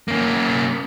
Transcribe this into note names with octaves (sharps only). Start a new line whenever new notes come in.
A#3 C#4